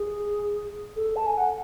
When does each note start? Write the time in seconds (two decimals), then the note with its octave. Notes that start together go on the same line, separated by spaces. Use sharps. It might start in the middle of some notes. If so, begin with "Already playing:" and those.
Already playing: G#4
0.96 A4
1.16 A5
1.26 G#5
1.38 F#5